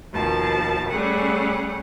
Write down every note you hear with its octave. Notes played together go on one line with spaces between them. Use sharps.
D#2 B2 F3 A5
G3 A3 C#4 G#4 F#5